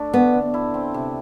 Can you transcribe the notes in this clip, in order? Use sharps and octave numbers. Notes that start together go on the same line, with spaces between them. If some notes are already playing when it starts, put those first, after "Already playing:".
Already playing: A3 D4 A4
D3 B3
D3
E4
C4
C3